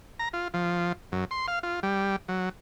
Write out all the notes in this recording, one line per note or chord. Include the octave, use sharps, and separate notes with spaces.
A#5
F4
F3
F#2
C6
F5
F4
G3
F#3